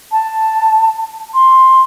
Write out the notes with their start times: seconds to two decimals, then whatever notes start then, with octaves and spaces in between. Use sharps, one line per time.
0.12 A5
1.34 C6